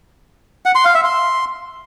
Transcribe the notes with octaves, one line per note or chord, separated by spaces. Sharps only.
F#5
C6
F5
E5
C6